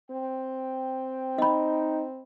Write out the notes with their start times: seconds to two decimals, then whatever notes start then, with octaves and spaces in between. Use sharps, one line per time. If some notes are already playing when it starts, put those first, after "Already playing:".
0.11 C4 G5
1.38 D#4 D#5 B5